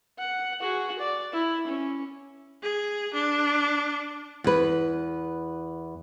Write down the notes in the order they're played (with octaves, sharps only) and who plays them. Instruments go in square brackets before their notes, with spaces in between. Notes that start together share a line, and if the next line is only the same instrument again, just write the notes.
[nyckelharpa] F#5
F#4 G#4
D5
E4
C#4
[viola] G#4
D4
[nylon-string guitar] E2 B4